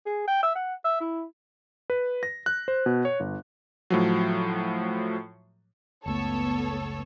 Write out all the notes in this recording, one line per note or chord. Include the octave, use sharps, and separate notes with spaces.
G#4
G5
E5
F#5
E5
E4
B4
A#6
F#6
C5
B2
C#5
G1
A2 F3 F#3
F#1 C#2 A3 B3 A4 C#5